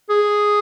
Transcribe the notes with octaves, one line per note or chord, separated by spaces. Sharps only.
G#4